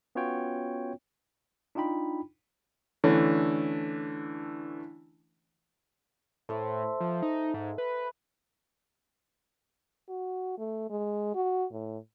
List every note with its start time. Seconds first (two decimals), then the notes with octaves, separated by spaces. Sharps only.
0.15 B3 C#4 F4 F#4 C#5 G5
1.75 D4 D#4 F4 G5 B5
3.04 D3 E3 A3 C#4 D4
6.49 A2 A4 C5 E5
7.00 F3
7.22 D#4
7.54 G#2
7.78 B4
10.09 F#4
10.58 A3
10.90 G#3
11.35 F#4
11.72 A2